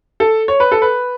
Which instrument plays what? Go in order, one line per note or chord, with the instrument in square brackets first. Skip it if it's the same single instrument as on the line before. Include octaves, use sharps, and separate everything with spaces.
[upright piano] A4
C#5
B4
A4
B4